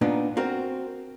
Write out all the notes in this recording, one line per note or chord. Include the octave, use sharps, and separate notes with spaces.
A#2 B3 D4 D#4
C4 F#4 A#4